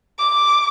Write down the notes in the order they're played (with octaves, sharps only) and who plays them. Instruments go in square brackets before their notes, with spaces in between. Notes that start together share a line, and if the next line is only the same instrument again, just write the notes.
[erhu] D6